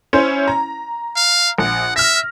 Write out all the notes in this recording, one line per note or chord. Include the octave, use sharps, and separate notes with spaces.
C#4 E4 C5
A#5
F5
A#1 F#5
E5 F6 A#6